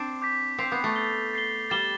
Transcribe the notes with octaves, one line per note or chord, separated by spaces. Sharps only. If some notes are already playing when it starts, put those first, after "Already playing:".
Already playing: C4 D4
D6 G6 B6
C4 G6 C7 F7
B3
A3
A6 C7 G7
A6 C7 G7
G3 A6 E7 G7